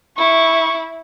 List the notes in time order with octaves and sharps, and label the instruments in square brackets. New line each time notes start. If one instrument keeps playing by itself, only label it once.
[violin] E4 [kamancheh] C#6